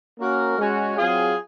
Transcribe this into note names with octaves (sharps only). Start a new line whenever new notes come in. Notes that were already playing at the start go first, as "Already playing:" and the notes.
A#3 C#4 F#4 A#4
G#3 C#4 F#4
F#3 C4 F4 G#4